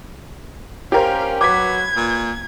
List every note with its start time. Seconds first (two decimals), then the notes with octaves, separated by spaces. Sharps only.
0.92 C#4 G4 A#4 C5 F5
1.41 F#3 B4 D6 G#6 B6
1.97 A#2